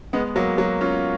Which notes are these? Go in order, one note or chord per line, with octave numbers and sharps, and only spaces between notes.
G#3 B3
F#3 A#3
F#3 A#3
C#4 F4